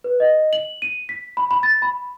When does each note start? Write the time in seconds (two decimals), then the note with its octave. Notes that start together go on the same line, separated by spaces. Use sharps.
0.04 B4
0.20 D#5
0.53 F#7
0.82 D#7
1.09 B6
1.37 B5
1.51 B5
1.63 A6
1.82 B5